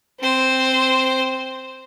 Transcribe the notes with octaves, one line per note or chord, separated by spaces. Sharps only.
C4 C5